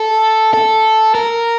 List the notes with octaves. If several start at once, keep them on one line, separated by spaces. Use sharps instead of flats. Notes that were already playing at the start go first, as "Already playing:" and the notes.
Already playing: A4
A4
A#4